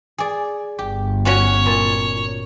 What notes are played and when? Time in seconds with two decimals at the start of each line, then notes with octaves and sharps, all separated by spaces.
0.18 G#4 D5
0.79 G1 G4
1.25 C#4 F#4 C#5
1.66 A#2 A5